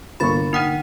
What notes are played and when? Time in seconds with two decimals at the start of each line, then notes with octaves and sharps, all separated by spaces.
0.20 G1 C2 D3 A#3 B5 C#6 A6
0.53 D#4 F#5 G5 D#6 F6 D#7